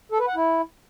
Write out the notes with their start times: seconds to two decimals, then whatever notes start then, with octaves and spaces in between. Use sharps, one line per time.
0.12 A4
0.20 B4
0.27 F#5
0.35 E4